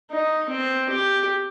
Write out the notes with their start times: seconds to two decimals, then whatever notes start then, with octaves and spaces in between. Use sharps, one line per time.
0.11 D#4
0.50 C4
0.89 G4